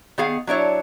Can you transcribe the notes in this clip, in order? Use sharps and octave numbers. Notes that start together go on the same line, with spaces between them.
D#3 B3 G#4 F5 F#5
F#3 D4 E4 C#5